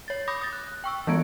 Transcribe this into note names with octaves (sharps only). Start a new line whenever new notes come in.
C#5 A6
B5 D6 D#6 G6 A#6
D#6 A6
F#6
G5 C#6 E6
E3 G3 G#3 B3 G#6 D7